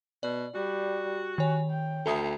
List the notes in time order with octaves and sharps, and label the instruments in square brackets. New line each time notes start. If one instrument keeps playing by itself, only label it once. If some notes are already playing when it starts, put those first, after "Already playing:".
[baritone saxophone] B2 [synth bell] D5
[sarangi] G3 [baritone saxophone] F#4
[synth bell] D#3 C#5 [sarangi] G#5
[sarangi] G5
[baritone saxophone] D2 [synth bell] A4 E5 D#6